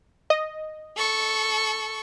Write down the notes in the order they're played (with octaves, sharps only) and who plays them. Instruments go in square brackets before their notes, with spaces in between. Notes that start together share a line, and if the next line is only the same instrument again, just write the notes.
[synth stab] D#5
[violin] A4 C#6